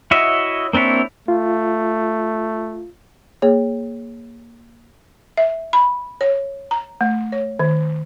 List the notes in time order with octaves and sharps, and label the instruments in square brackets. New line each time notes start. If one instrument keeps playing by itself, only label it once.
[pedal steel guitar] E4 F#4 C#5 D#5 E5
A#3 C4 D4 E4 C#5
[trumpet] A3 [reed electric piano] F4
[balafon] A#3 G#4 C#5
E5
B5
C#5
A#5
A3
C#5
D#3